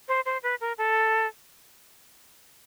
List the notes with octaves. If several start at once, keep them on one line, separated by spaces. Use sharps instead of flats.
C5
C5
B4
A#4
A4